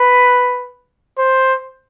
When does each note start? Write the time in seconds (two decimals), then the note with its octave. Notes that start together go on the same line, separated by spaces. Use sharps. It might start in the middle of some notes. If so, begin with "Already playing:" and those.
Already playing: B4
1.18 C5